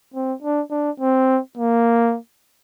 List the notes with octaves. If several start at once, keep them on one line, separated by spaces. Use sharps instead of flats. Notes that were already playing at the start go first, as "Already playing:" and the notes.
C4
D4
D4
C4
A#3